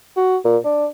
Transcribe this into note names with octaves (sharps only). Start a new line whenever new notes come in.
F#4
A#2
D4